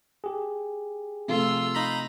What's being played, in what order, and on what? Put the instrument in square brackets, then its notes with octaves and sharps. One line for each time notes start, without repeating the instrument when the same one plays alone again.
[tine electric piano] G4 G#4
[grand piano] C3 F3 A3 [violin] F4 E6
[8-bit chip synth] D#4 A#5 B5